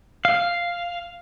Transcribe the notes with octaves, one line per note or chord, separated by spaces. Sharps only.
F5